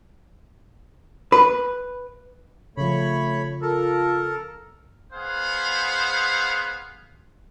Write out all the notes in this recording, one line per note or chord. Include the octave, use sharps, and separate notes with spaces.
B4
C#3 F3 A3 C#5 B5
F4 A4 A#4
B3 G#4 C5 F5 F#5